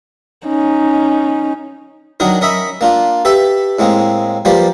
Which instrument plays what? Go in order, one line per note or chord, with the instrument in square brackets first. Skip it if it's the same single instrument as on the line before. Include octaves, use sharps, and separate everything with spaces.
[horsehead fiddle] C#4 D#4
[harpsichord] D#3 F#3 D4 D#4 A#4
C#4 A#4 D#5 E5 B5
A#3 D4 F4
G4 A4 B4 E5
A2 G#3 A#3 C4
F3 G3 A#3 B4 C5 D5